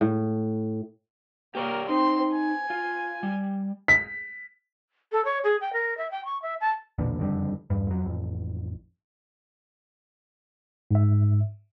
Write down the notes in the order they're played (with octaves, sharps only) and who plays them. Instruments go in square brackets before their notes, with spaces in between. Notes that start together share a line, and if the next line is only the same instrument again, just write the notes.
[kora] A2
[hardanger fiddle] A#3 A#4 [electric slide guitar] G4 C#5 D5
[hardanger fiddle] C4 C6 [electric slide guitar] D#4
[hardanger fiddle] G#5
[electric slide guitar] F4
G3
[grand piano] B6
[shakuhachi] A4
C#5
G#4
G5
A#4
E5
G5
C#6
E5
A5
[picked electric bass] B1 E2 A#2 D3
F#1 F2 D3 G3
E2 G2
F2 F#3
A1 F2
[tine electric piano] G#2 E5